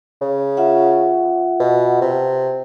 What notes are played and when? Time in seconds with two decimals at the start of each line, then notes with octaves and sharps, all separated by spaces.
0.21 C#3
0.57 F4 E5 F#5
1.60 B2
2.01 C3